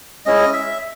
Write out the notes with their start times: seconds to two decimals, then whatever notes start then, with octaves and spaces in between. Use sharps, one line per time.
0.26 G#3 C#4 E4 D#5
0.53 E5